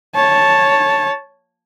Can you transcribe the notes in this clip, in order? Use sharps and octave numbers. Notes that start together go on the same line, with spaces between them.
C#5 A5